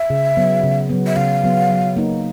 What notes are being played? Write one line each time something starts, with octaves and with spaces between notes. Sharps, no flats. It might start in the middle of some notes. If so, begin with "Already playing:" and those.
Already playing: E5
C#3
F#3 B3
C#3
F#3 B3
E5
C#3 F5
F#3 B3
F#3
A#3 D#4